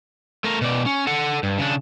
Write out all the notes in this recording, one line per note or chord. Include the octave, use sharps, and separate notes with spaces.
A3 A#4
B2 D5
C#4
A4 F#5
G2
C#3 D4